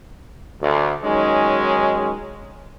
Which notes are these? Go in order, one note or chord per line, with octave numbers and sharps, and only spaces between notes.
D2
D#3 F#3 G#3 C#4 D#4